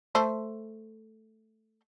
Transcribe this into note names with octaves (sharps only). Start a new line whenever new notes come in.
A3 C5 A5